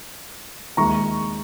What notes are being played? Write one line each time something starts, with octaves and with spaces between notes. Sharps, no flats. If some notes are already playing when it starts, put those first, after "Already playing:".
D#2 D#3 G#3 A#5 C#6